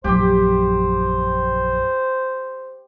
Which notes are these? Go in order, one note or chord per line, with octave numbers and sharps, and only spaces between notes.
A#1 F#2 G4 C5